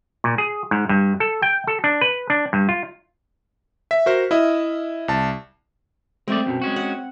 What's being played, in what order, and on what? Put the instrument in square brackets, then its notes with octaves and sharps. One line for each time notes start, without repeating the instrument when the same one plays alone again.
[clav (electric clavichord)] A#2
G#4
G#2
G2
A4
G5
A4
D4
B4
D4
G2
F4
[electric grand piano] E5 B6
F#4 A#4 C5 F6
E4 D#5 E5
C2 A5
[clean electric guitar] G#3 A3 D5 [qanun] C4
[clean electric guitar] F#2 B2
G#3 C#4 F#4
[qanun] F#5